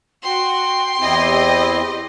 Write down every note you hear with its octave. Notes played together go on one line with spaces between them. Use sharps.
F#4 G5 C6
E2 C4 E4 G4 D#5